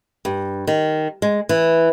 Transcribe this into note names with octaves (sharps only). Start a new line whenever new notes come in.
G2
D#3
G#3
E3